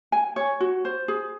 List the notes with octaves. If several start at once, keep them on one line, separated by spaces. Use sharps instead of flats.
G#5
C#5
F#4
C5
G#4